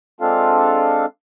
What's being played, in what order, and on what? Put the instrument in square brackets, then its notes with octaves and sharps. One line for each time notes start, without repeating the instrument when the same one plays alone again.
[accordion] G#3 C4 D4 F4 A4 F5